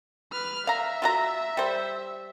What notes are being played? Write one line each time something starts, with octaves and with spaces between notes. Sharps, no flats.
B4 F6
E5 F5 A#5
F4 F#4 A#5
G3 C5